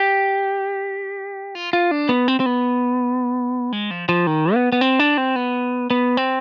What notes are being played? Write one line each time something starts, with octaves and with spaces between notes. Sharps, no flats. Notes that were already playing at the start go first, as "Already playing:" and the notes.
Already playing: G4
F4
F4
D4
B3
C4
C4
B3
G#3
F3
F3
D#3
B3
B3
C4
D4
C4
B3
B3
C4